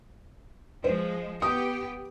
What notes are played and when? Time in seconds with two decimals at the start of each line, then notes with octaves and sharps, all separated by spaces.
0.84 F3 G#3 C5
1.42 B3 G4 D#6